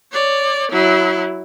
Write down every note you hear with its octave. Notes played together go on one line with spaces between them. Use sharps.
C#5 D5
F#3 E4